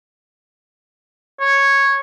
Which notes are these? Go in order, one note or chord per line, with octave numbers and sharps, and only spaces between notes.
C#5